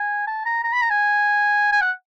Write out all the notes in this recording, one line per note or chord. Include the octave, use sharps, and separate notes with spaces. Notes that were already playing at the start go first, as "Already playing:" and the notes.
Already playing: G#5
A5
A#5
A#5
B5
A#5
G#5
G#5
F#5